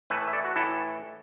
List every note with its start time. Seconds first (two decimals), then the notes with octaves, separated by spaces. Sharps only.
0.10 A2 E3 A3 B4 E5
0.28 E5
0.33 A4 D5
0.45 F#4
0.56 A2 E3 E4 A4